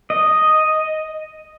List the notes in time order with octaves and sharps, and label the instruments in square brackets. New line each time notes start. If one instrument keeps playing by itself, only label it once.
[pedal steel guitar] D#5